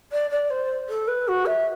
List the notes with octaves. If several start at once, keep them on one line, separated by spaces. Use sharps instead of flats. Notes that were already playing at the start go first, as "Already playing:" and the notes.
D5
D5
C5
A4
B4
F#4
E5